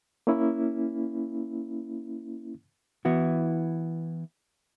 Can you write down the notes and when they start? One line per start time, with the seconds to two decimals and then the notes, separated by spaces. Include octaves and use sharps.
0.27 A#3 C#4 E4
3.05 E3 B3 E4 F#4